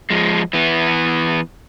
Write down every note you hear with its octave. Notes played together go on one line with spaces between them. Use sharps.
F3 G#3
E3 B3